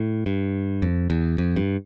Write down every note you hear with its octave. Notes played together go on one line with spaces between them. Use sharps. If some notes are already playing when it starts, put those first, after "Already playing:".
Already playing: A2
G2
F2
E2
F2
G2